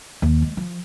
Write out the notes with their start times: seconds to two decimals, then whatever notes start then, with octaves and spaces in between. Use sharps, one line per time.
0.22 D#2
0.42 G#3
0.57 F3